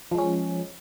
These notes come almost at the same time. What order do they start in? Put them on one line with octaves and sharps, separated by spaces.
F3 G#3 C#4